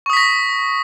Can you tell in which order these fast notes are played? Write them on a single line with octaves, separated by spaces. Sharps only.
C#6 D#6 B6 A#6